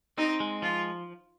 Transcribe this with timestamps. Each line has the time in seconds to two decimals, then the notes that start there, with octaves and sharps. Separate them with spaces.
0.17 C4 D#4
0.40 G#3
0.62 F3 F4